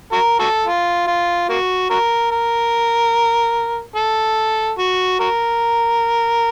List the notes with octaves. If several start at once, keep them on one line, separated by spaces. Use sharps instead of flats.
F#4 A#4
F#4 A4
F4
F4
A#3 F#4
F#4 A#4
A#4
A4
F#4
F#4 A#4